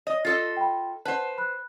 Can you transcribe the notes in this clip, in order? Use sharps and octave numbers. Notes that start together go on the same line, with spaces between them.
C#5 D#5 D#6
F4 A4 D#5 A6
G5 B5
B4 C5 F#5 A5
B5 F#6